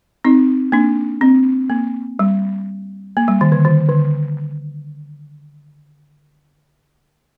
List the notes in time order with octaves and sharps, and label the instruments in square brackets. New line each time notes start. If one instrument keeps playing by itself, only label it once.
[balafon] C4 D#4
A#3 D4
C4
A#3
G3
A#3
G3
D#3
D3
D#3
D3